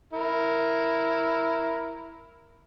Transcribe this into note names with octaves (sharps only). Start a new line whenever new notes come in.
E4 A#4